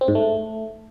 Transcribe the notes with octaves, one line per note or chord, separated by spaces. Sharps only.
C4
G#2
A3